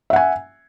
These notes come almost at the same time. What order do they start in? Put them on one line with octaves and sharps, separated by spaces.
E5 F#5 G#5